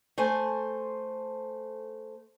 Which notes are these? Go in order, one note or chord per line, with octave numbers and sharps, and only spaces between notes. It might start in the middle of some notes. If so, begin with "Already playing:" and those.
A3 C5 G#5